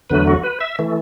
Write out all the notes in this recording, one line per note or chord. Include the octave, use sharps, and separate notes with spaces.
E2 D3 F#3 A3 B4
F#4
B4
E5
E3 A3